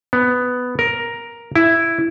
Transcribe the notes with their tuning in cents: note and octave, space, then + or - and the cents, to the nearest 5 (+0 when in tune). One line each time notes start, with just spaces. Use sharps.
B3 +10
A#4 +5
E4 +5